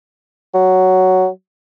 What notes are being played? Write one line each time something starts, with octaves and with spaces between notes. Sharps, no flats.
F#3